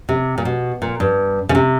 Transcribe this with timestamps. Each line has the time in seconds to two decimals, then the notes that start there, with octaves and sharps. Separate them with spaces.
0.09 C3
0.38 A#2
0.45 B2
0.82 A#2
1.00 G2
1.49 C#3
1.55 C3